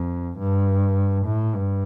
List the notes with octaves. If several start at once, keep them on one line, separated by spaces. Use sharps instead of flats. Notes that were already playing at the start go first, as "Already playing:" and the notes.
Already playing: F2
G2
A2
G2